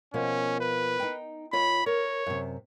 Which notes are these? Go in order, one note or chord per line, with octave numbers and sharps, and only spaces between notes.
B2 F3 A#3 C#4
B4
D#4 G5
D#2 F4 C#5 B5
A#4 C#5
F#2 C3